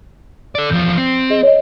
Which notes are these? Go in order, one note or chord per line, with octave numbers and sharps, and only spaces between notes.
A4 D5
E2 F3 G6
C4 C7
G#4 D#5
C#5 D#5